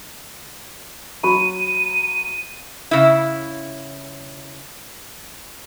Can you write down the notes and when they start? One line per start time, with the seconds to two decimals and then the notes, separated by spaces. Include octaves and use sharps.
1.23 F#3 B5 C#6 D#7
2.91 C#3 E4